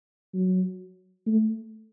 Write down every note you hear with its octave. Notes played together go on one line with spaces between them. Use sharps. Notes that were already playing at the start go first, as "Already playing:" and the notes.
F#3
A3